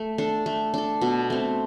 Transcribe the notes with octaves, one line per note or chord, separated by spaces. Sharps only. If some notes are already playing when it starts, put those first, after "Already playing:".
Already playing: A3
D4 A4
A3
D4 A4
B2
A3 C4